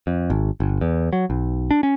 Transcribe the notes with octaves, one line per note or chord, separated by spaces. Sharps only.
F2
G#1
G1
E2
F#3
B1
D4
C#4